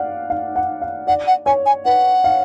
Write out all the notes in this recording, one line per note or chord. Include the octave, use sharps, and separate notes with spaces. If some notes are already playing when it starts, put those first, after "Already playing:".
Already playing: D5 F5 F#5
F5
F#5
F5
D5 F#5
F#5
C#5 G#5
G#5
B4 F#5
F5